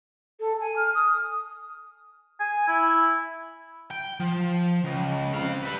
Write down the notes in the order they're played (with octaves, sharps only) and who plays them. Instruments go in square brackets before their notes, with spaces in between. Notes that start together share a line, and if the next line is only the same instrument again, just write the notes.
[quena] A4
G#5
F6
D#6
[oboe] G#5
E4
[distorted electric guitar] G5
F3
C#2
C4 F5
G3 B4